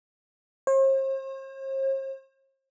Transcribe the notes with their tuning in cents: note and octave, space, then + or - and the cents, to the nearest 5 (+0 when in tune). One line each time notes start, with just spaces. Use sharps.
C5 +45